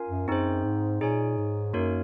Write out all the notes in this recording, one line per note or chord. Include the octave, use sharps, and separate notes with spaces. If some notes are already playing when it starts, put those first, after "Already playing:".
Already playing: C#4 F4 A#4 F5 G#5
F#2
F#2 C4 D#4 G#4 C5
G#2
A#2 D#4 G#4 C#5 G#5
G#2
F#2 A#3 D#4 F#4 A#4 C#5